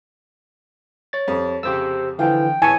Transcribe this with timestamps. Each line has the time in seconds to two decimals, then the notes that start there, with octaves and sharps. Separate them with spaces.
1.13 C#5 A6
1.28 F2 G3
1.63 F2 C#3 G4 C5 E6
2.19 D3 E3 F3 F4 G5
2.62 A2 E3 G#5 A5 C#6